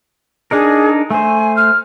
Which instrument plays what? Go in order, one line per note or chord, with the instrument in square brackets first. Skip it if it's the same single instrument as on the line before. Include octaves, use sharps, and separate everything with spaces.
[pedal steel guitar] D4 D#4 A#4 [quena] G#4
[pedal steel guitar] A3 C5 [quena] G#5
[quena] F6